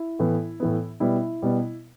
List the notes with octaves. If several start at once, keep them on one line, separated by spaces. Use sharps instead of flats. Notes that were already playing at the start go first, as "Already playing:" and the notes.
Already playing: E4
A2 E3 B3
A2 E3 B3
B2 G3 B3 E4
B2 G3 B3